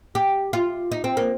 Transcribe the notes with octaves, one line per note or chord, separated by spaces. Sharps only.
G4
F4
D#4
C4
A#3